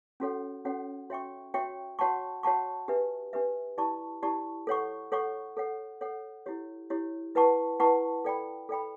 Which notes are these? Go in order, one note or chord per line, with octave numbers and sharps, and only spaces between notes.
C#4 F#4 A4 C#5 F#5
C#4 F#4 A4 C#5 F#5
F#4 C#5 E5 G5 C#6
F#4 C#5 E5 G5 C#6
F#4 C#5 F#5 A5 C#6
F#4 C#5 F#5 A5 C#6
D4 G4 B4 E5
D4 G4 B4 E5
E4 G4 D5 A5 C#6
E4 G4 D5 A5 C#6
A4 C#5 F#5 C#6
A4 C#5 F#5 C#6
A4 C#5 F#5
A4 C#5 F#5
E4 G4 C#5
E4 G4 C#5
E4 B4 F#5 A5 C#6
E4 B4 F#5 A5 C#6
A4 D5 G5 B5
A4 D5 G5 B5